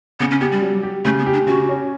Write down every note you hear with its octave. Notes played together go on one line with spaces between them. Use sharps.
C#3 B3
C#4
B3 G4
G3
F#3
G4
C#3 A3
B3
G4
D4
C#3 F#4
C#4